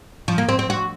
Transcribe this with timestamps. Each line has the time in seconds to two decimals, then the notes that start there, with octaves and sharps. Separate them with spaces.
0.28 F3
0.38 A#3
0.49 C4
0.59 C4
0.70 F#4